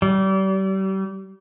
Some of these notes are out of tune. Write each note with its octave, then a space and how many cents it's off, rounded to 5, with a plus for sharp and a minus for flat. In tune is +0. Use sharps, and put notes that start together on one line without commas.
G3 -35